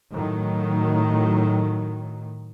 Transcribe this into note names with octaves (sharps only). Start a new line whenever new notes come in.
A2 D#3 F#3